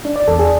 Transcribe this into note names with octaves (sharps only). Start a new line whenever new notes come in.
D4
D5
E2 A4
G#4